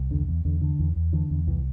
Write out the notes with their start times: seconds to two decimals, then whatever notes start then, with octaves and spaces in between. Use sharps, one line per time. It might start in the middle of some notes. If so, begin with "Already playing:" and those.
Already playing: C2
0.11 E2 D3
0.29 E2
0.45 E2 D3
0.62 D3
0.79 E2 E3
0.96 E2
1.13 D3 E3
1.30 E2
1.47 C2 E3